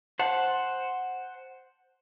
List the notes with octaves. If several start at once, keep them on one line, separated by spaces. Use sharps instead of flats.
C5 F#5 A5